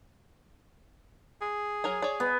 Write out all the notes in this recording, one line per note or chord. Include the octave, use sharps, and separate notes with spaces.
G#4
F#3 A#4 G#5
C#5 D5
B3